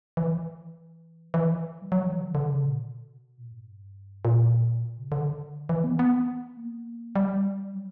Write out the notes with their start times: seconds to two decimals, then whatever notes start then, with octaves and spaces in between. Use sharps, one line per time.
0.17 E3
1.34 E3
1.82 G3
1.92 F#3
2.07 E3
2.20 D3
2.35 D3
2.49 C#3
2.65 A#2
2.78 B2
3.38 A#2
3.52 G2
4.25 A#2
4.83 B2
4.98 C#3
5.12 D3
5.69 E3
5.84 B3
5.99 B3
6.57 A#3
7.16 G3
7.73 F#3